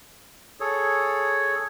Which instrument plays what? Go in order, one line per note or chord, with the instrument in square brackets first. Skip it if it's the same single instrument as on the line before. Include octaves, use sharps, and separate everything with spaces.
[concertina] G#4 A4 C#5